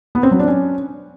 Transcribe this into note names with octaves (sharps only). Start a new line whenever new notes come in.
B3
C4
F#3
D4
C#4